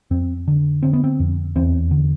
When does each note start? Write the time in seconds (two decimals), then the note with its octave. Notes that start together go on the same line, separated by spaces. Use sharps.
0.11 F2 C4
0.48 D3
0.83 D3 C4
0.93 B3
1.04 C4
1.20 F2
1.56 E2 C4
1.91 D3